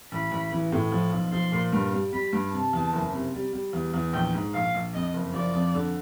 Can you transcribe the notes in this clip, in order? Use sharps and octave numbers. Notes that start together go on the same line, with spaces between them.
A1 B5
A1
E3
A2
F3
B1
F3 C6
A#2
G2
G3
G3 B5
G2
C3 A5
E2
F#1
C3
G3
G3
E2
E2
A#1 G5
G#2
A#1 F5
A#1
F2 D#5
F#1
F3 D5
F2
D3